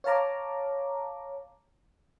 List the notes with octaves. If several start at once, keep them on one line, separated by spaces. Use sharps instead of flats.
C#5 F5 A5 A#5 D6